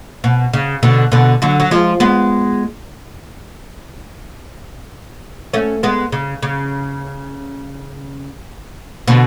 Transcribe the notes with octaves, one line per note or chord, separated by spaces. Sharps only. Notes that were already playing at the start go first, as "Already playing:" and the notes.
B2
C#3
B2 D3
B2 D3
D3 F#3
F#3
F3 G#3
G#3 B3
A3 C#4
G#3 B3
C#3
C#3
B2 D3